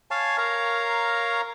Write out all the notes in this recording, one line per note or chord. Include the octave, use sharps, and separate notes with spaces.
C#5 F5 G#5 A5
A#4 C#5 F5 A#5